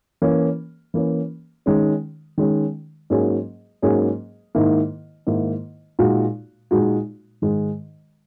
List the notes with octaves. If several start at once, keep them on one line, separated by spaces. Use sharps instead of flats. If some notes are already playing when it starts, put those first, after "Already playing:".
E3 A#3 C#4
E3 A#3 C#4
D#3 G#3 C#4
D#3 G#3 C#4
G#2 F#3 A#3 C#4 G#4
G#2 F#3 A#3 C#4 G#4
G#2 D#3 A#3 E4
G#2 D#3 A#3 E4
A#2 G#3 D#4 F#4
A#2 G#3 D#4 F#4
G#2 D#3 G#3